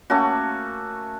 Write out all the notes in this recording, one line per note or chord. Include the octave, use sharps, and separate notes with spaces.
A3 A#3 C#4 F#4